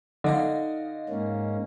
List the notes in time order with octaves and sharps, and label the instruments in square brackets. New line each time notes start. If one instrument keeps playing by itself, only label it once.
[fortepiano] D3 [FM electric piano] D#4 D#5 F5
[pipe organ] G#2 A#3 C#4